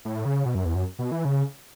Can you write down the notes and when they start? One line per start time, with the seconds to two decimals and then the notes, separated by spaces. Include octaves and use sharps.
0.05 A2
0.25 C#3
0.46 B2
0.55 F#2
0.65 E2
0.75 F#2
0.99 B2
1.12 E3
1.25 C#3